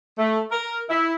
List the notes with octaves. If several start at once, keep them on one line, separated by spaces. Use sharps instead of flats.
A3
A#4
E4